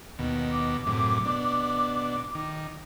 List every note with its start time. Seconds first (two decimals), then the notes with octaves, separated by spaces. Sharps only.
0.19 D#2 B2
0.51 D6
0.87 F#2 A2 C3
1.25 B2 D4
2.35 D#3